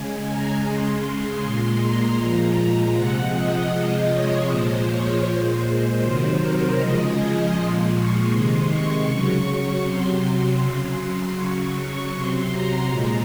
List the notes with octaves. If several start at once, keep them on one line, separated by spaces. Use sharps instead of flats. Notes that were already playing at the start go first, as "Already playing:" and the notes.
Already playing: C#3 G#3 G#5
A#5
C#3 G#3 C6
A#2 G#3
A#5
A#2 F3 G#3
C3 F3 G#3 F#5
D#5
C3 F3 G#3
C#5
A#2 F3 G#3 C5
C#5
A#2 G#3 C5
C3 D#3 F#3
A#4
C#3 F3 G#3 D#5
G#5
A#2 F3 G#3 C6
C#6
C3 D#3 G#3 C6
C#6
C#3 F#3
C#6
C3 F#3 C6
C6
C#3 F#3
C#3 F#3 C#6
C3 F#3 C6
A#5
A#2 F3 G#3 A#5